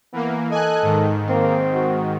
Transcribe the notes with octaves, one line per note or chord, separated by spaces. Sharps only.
E3 A#3 B3
A4 D#5 G#5 F#6
G#2 D#3
A#3 C4
F#4